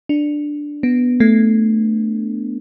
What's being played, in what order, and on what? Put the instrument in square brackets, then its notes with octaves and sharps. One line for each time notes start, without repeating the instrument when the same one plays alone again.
[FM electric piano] D4
B3
A3